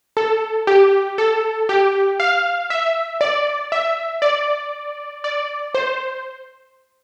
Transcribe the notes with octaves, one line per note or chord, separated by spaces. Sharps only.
A4
G4
A4
G4
F5
E5
D5
E5
D5
D5
C5